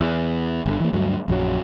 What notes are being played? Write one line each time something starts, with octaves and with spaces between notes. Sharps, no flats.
E2
G1 D3
E3 A#3
D2 G2 F#3
A#1 F#2 D3 F#3